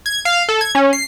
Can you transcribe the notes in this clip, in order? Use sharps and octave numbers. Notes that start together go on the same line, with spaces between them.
G#6
F5
A4
G#6
C#4
C7